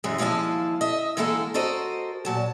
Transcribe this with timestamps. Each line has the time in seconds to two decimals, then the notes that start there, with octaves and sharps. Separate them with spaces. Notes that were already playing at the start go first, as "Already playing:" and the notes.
0.04 F#2 E3 G#3
0.18 D#2 F3 G#3 E4 F5 A5
0.81 D#5 E5
1.17 D3 E3 G#3 A#3 E4 A4
1.54 F#4 A4 A#4 C5 D#5
2.25 A#2 F#3 A5